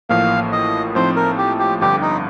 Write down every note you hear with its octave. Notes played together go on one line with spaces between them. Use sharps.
A1 A2 F3 A#3 F5
D#5
A2 F3 C4 D#4 C5
A#4
G4
G4
G1 G2 D3 G4
D#4